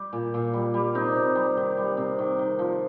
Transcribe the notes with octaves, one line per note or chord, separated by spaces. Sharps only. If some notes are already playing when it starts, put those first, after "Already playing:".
Already playing: G3 G4
A#2
A#2
G3
G3
C3 D#4
C3
G3
D#3
G3
C3
D#3
D#3
F3